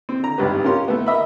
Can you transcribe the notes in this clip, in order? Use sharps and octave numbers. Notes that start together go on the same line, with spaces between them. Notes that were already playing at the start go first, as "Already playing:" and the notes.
C4
D3 A#5
G#1 C#2 G2 G3 G4 B4
C#4 F4 G4 A#4 C6
A3 B3
A#4 D#5 E5 B5